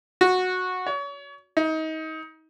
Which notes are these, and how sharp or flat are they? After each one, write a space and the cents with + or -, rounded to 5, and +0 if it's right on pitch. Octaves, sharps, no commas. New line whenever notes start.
F#4 -10
C#5 +35
D#4 +30